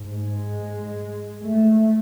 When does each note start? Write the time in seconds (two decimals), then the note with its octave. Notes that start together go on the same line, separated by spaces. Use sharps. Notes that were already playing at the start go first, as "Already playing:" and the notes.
Already playing: G#2
0.13 G#3
1.45 A3